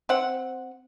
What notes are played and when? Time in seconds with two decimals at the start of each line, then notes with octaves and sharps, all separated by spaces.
0.09 C4 F#5